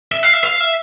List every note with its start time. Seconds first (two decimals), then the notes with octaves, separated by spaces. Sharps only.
0.12 E5
0.23 F5
0.33 E5
0.44 F5
0.60 E5